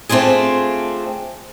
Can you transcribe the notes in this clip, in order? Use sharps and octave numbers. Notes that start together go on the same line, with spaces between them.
A3 C4 D4 F4 G#4